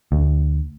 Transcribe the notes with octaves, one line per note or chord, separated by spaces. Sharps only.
D2